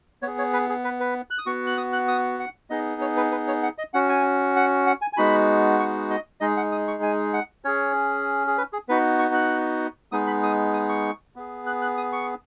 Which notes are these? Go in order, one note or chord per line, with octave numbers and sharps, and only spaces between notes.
B3 G#4 C#5
C#5
B4
G#4
B4
B4
F#6
D#6
B3 F#4 C#6
F#6
D#6
F#6
D#6
F#5
B3 D#4 G#4 D#5
C#5
B4
B4
C#5
F#5
D#5
C#4 F#4 F#5
G#5
F#5
F#5
G#5
G#5
G#3 B3 D#4 F#4 B5
C#6
D#5
G#3 D#4 G#4 D#5
F#5
D#6
C#6
G#5
F#5
C#4 G#4 C#5
G#4
B4
G#4
B3 D#4 F#4 B4
C#6
F#6
G#3 B3 D#4 G#4 D#6
B5
D#6
D#6
C#6
B3 G#4
F#6
F#6
D#6
C#6